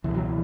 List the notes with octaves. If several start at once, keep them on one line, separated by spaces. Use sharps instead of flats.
C#2 B2 E3
F#3
E3